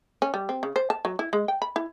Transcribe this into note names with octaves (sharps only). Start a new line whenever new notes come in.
C#4
G3
C4
C#3
C5
A5
F#3
E4
G#3
G5
B5
E4